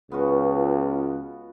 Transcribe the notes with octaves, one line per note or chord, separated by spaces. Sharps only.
C#2 B3 F4 F#4